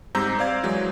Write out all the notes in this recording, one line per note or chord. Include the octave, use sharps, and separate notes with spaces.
G#2 G3 C4 A#5 E6 G6
C5 D5 F5 G#6
E3 F#3 G#3